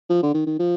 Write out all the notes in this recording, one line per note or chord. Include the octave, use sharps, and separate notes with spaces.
F3
D3
D#3
D#3
F3